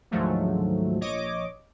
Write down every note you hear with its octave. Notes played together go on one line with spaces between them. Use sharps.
D2 G#2 D#3 F3 F#3 A3
A#1 C#5 D#5 D6